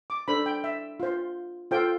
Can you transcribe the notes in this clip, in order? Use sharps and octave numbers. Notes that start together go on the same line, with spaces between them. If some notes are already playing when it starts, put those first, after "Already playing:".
D6
D4 A4 C5 B5
G5
E5
F4 C5
F4 A4 C5 G5